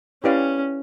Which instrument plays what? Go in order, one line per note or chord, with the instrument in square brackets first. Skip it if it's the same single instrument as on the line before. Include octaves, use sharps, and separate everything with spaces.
[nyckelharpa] C#4 [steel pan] E4 G4 B4 D5 F5